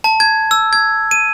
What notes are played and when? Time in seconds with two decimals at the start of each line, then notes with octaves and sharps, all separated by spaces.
0.04 A5
0.20 G#6
0.51 E6
0.73 G#6
1.11 D#7